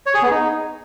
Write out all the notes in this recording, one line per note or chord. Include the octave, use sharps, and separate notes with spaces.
C#5
G#4
B3
D#4